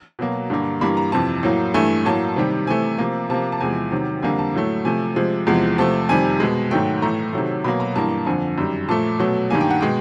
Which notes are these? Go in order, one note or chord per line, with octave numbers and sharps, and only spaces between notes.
B2 F#3 A#3
G2 D3 G3 A#3
G2 E3 G3 A#3 B5
A#5
F2 C3 E3 A5
A2 F#3 A#3
G2 E3 A3 G#5
A2 F#3 A#3 A5
C3 D#3 G3
C3 E3 A3 G#5
C3 F3 A#3
C3 F3 A#3 A5
A5
E2 C3 F3 G#3 G#5
C3 D#3 F#3
F2 D3 G3 A#3 G#5
A5
A2 F#3 A3
C3 F3 A3 G#5
C3 F3 G#3
E2 C3 F3 G#3
C3 F3 A3 A5
F2 C3 D#3 G3 G#5
B2 G#3
G#2 D#3 F#3 A3 G5
A2 E3 A3 A#5
C3 D#3 F#3 A3
B2 F#3 A#3 B5
A#5
G2 E3 G3 A#3 A5
F2 D3 F3 G#5
F#2 D#3 G3
A#2 F3 A3 A5
B2 F#3 A3
G2 D#3 G3 A#3 G#5
G5
F#5
B2 G#3 G5